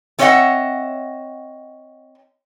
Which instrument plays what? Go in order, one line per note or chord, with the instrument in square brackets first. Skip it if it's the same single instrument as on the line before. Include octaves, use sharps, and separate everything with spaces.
[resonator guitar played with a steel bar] A3 C4 C#5 D#5 E5 F#5